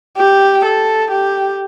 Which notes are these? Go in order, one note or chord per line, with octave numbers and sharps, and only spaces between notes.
G4
A4
G4